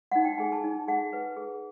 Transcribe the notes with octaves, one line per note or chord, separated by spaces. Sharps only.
D#4 F#5
G5
G#4 G#5
A5
D#4
G#4 F#5
B4
G#4